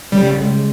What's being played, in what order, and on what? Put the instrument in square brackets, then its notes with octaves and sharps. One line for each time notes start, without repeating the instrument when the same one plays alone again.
[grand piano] C#3 [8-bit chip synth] G3
[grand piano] G#3